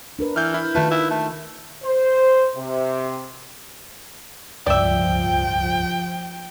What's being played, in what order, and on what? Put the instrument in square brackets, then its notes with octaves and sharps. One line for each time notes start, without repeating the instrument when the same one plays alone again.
[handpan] D4 A#4 B4
[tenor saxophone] E3 [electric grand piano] F6 G6
[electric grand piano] E4
[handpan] D#3 F4 [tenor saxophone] A3 [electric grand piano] B4
[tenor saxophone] E4
A3
[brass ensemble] C5
C3
[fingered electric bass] D1 C#2 G2 [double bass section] F3 [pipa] D5 E5 [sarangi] G5